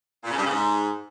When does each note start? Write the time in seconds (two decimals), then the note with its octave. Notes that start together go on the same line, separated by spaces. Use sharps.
0.24 A#2
0.31 C#3
0.37 G2
0.44 C#3
0.50 G#2